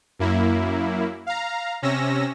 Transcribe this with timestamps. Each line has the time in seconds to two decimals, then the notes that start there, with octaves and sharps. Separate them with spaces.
0.19 F#2 A#3 E4
1.26 F5 A#5
1.82 C3 C#4 E6 A#6